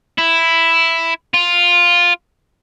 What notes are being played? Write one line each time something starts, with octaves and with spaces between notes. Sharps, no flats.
E4
F4